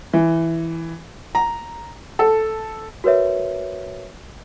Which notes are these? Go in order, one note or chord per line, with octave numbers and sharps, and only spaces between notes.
E3
A#5
A4
F#4 A#4 B4 C#5 E5